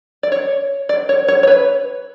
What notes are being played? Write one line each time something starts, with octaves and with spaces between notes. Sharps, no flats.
D5
C#5
D5
C#5
C#5
C#5
B4